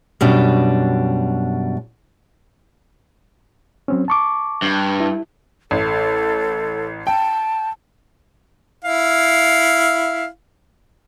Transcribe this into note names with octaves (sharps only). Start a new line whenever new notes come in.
F#2 B2 G3 D4
F#3 C4 C#4
A5 C#6 D6
G2
E4
A1 A4
G5 A5
E4 F5